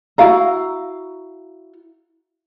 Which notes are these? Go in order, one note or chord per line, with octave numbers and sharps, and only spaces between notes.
E4 F#4 F5 A#5